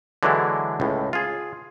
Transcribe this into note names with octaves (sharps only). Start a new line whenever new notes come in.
D3 E3 F#3 G#3 D4 E4
C#2 A2
F4 G#4